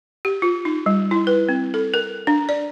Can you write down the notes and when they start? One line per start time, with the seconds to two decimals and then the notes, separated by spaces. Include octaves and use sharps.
0.25 G4
0.42 F4
0.65 D#4
0.86 G3
1.11 E4
1.27 B4
1.49 C4
1.74 A4
1.94 A#4
2.27 D4
2.49 D5